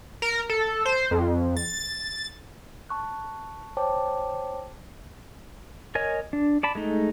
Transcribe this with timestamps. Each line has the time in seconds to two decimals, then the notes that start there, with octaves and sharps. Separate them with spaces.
0.22 A#4
0.50 A4
0.86 C5
1.11 F2
1.57 A6
2.89 A5 C#6 F#6
3.77 C5 C#5 G5 A5 D6
5.95 A#4 C#5 D#5 G#5
6.33 D4
6.63 D5 A5 B5
6.75 G#3 A3 D#4